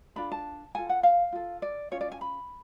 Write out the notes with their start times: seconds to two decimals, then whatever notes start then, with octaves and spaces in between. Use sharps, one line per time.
0.16 D4 F4 A4 B5
0.32 A5
0.75 F4 A4 G#5
0.89 F#5
1.03 F5
1.33 F4 A4
1.62 D5
1.91 C#4 F4 G#4 C#5
2.01 D5
2.12 G#5
2.21 B5